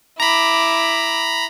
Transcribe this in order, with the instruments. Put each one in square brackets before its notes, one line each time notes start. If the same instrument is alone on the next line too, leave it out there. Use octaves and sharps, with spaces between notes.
[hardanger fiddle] E4 D6 [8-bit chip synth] A#5 B5